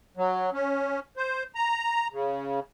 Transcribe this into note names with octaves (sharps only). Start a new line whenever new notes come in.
F#3
C#4
C5
A#5
C#3